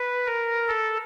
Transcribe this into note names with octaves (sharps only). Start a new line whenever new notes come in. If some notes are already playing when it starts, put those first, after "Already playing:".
Already playing: B4
A#4
A4